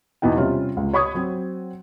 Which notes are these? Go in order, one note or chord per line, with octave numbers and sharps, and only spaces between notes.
E2 B2 B3 D#4 G5
C3 G3 C#4 F4
C#2
C#5 B5 C#6 D#6 G#6
F#3 C4